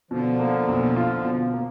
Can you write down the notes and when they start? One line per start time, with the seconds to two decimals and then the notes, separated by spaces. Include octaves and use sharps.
0.11 B2 D3 F3
0.40 A#3
0.68 B1
0.96 F4
1.25 B2
1.53 A#3